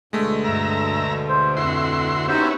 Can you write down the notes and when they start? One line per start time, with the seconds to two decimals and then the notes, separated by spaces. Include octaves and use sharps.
0.13 D2 B2 D3 G#3 A3
0.44 G2 E5 A#5
1.28 C5
1.57 F2 E4 F#4 C6
2.28 B3 C#4 D#4 E4 F#4 G4 C5